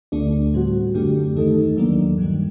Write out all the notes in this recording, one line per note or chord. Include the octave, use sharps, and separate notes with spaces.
D2 D3 A3 D4
A2 G3 C4 F#4
F#2 D3 A3 D4 G4
D#2 D#3 A3 D#4 A4
D#2 D#3 F#3 A#3 D4
G2 D#3 G3